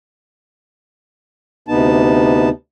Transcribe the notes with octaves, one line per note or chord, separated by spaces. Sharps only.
D2 C3 B3 D#4 A5